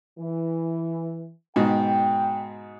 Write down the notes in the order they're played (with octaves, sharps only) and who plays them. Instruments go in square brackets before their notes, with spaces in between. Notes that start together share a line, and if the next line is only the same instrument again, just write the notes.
[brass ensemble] E3
[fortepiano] G#2 B2 [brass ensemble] G5